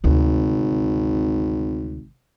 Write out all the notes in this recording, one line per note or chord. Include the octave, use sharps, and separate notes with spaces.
G#1 D2 C3